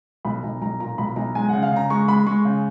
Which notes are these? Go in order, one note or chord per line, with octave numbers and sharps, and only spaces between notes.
B1 B5
B1 A#5
B1 A#5
A#2 A#5
B1 B5
B1 A#5
G#3 G#5
C#3 F#5
F5
C#3 A#5
G#3 C#6
G#3 B5
G#3 C#6
C#3